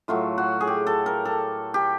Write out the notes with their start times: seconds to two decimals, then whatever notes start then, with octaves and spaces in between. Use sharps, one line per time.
0.08 A2 F#3 A3 F4
0.38 F#4
0.61 G#4
0.67 G4
0.87 A4
1.06 A#4
1.25 A4
1.74 G4